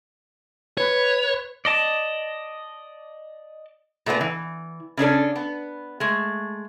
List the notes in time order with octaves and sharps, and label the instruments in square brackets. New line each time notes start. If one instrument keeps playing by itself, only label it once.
[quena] B4 [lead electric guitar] C#5
[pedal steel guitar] D5 D#5 A5
[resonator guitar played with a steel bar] A#2 A3 B3 B4
E3
C#3 C#4 D4 A4
B3
G#3 A3